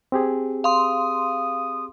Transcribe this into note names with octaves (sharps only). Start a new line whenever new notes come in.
C4 G4 G#4
F5 C6 D#6